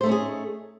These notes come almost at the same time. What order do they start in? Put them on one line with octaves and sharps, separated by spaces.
C5 A3 D#4 C#4 G#4